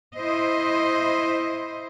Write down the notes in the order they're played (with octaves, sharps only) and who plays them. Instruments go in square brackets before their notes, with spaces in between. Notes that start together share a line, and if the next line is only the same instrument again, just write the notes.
[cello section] E4 C5 D#5